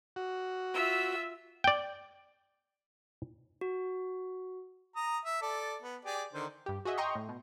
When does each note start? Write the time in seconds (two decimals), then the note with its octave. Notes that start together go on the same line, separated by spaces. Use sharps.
0.16 F#4
0.74 F4 E5 E6
1.64 D5 G5
3.61 F#4
4.96 A#5 D#6
5.25 E5
5.42 A4 D5
5.82 B3
6.05 G4 G#4 D5
6.33 D3 D#3 C5
6.66 G2 G4
6.85 F#4 G#4 D#5 E5
6.98 D#5 G5 A#5 C6 C#6
7.15 A2
7.29 B2